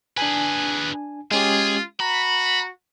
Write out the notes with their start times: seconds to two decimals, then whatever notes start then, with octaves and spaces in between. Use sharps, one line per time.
0.17 D4 G#4 B4 G#5
1.31 G#3 C#4 F4 G4 G#4
2.00 F#4 A#5 B5